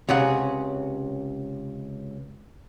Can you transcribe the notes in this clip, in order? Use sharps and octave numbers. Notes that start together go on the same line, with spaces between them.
C#2 C3 C#4 G#4 F#5